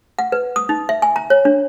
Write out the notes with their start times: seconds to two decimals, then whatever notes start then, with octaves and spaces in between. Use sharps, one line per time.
0.19 F#5
0.32 B4
0.56 D#6
0.69 D#4
0.89 E5
1.02 G#5
1.16 A#5
1.30 C#5
1.45 D4